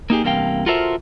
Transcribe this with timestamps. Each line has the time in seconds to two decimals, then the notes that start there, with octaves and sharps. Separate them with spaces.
0.10 A#3 D#4 G4 G#4
0.24 E2 G2 C3 A#3 F5 G5
0.66 F4 F#4 A4 A#4 C5 E5